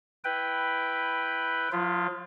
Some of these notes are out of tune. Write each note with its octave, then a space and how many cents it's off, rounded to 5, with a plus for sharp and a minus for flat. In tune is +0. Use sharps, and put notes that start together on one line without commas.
E4 +0 B4 +0 G5 +0
F3 +35 F4 -25